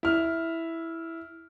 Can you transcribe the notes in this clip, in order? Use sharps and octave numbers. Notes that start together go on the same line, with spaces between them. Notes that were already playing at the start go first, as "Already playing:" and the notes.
E4 F6